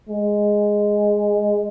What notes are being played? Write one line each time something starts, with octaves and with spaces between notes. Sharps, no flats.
G#3